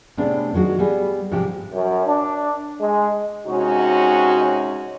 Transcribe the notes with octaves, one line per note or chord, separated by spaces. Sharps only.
A2 C3 G#3 B3 C4 D4
D#3 F#3 G#3 F#4
G3 B3 G#4
G#2 C3 F3 G4
F#2
D4
G#3
C3 G#3 C#4 D#4 F#4